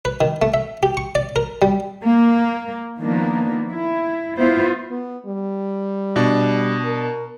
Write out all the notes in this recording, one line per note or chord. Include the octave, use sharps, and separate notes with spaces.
B4
D#3
A3
E5
G4
C#6
D5
A#4
G3
A#3
D#3 F3 A#3 B3 D4
E4
B3 E4 F4 C5
B3
G3
B2 D4
A#4